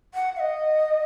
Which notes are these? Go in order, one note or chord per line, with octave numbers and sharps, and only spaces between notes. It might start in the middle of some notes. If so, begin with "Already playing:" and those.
F#5
F5
D#5